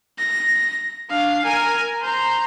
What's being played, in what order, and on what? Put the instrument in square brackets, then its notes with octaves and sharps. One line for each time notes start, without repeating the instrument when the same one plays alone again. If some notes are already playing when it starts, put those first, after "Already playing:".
[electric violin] A#6
D4 F5
A#4 G#5
C5 A#5